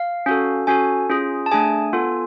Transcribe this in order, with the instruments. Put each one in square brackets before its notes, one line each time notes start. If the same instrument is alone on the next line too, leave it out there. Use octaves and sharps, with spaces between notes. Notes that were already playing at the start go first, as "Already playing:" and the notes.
Already playing: [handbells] F5
C#4 F#4 A4
C#4 F#4 A4 G#5
C#4 F4 G#4
A5
A3 D4 G#4 G#5
B3 F4 A4